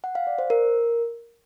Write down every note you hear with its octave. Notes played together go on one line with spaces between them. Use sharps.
F#5
F5
D5
C5
A#4